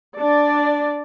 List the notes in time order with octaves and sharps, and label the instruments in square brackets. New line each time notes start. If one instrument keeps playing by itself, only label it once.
[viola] D4 D5